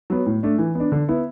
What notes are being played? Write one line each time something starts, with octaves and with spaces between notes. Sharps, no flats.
F#3 B3
A2
A3 D4
E3
B3 D4
D3
B3 E4